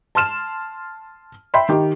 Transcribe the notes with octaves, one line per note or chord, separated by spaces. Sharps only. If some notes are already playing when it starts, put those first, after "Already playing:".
A5 C6 F6 E7
E5 G5 B5 C6
D#3 G4